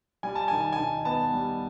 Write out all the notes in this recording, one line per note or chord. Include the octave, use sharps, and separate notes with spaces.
G3 G#5
A5
D#3 G#5
A5
G#5
D#3
B3 A5
G3